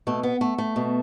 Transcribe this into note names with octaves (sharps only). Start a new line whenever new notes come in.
B2 A3
B3
A3
A3
B2